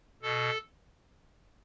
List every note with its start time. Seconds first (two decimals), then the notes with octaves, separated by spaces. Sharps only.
0.22 B2 A4